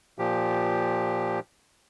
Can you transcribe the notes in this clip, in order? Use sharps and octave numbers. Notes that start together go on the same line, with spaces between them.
A#2 F3 G4